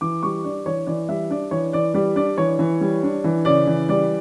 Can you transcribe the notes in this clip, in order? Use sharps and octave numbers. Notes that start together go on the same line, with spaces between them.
E3 D6
G3 C#6
D4 D5
E3 C#5
E3 D5
G3 E5
D4 D5
E3 C#5
E3 D5
G3 D5
D4 D5
E3 C#5
E3
G3
D4
E3
C#3 D5
E3
G3 D5